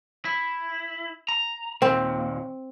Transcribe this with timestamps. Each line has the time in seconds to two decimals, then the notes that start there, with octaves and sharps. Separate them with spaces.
0.25 E4
1.28 A#5
1.82 D#2 A#2 C4